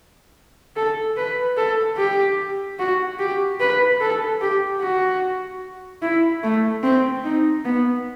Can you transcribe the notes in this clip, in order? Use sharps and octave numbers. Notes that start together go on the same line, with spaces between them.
A4
B4
A4
G4
F#4
G4
B4
A4
G4
F#4
E4
A3
C4
D#4
B3